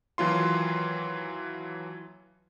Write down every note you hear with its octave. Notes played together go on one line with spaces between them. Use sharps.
D#2 E3 F#3 F4 C6